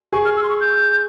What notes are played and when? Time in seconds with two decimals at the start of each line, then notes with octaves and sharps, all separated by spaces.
0.13 G#4 C#6
0.25 F6
0.37 E6
0.43 C6
0.49 C#6
0.61 G6